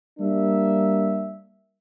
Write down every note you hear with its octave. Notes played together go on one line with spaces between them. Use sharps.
G3 A#3 D4 E5